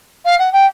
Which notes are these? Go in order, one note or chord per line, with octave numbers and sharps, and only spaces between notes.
F5
F#5
G5